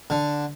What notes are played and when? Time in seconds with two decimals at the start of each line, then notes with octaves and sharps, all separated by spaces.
0.10 D3